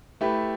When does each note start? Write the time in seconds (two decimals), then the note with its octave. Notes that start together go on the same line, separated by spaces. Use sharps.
0.21 A3 E4 G4 B4